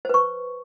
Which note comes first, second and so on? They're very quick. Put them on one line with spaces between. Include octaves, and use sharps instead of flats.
C5 B4 C#6